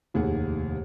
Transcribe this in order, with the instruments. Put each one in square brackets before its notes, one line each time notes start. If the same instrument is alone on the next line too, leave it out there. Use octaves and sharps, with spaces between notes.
[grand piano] F1 D#2 A2 G#4 F#5